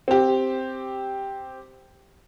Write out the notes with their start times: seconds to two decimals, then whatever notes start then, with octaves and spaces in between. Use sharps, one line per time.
0.08 C4 G4